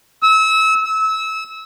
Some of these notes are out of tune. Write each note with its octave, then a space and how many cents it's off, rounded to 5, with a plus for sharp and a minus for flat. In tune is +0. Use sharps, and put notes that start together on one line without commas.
E6 -30
E6 -25